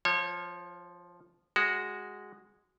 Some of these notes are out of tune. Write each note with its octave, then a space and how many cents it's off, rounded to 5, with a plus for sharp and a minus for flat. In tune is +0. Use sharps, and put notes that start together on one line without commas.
F3 +0 C#5 -30
G#3 -5 F#4 +10